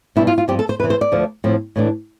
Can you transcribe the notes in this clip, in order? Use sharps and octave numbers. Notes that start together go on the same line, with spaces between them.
B2 G3 D4 E4
F4
F4
G2 F3 C4 G4
A4
C5
E2 C3 E3 B4
C5
D5
D2 D3 F3 A3
A2 F3 C4
A2 E3 A3 D4